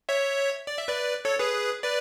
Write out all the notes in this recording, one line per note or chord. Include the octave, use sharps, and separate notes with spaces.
C#5 E5
D5
E5
B4 D5
A4 C#5
G#4 B4
B4 D5